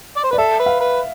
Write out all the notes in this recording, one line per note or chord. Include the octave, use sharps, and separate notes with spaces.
D5
C5
B4 D5
A4 E5
B4
F5
B4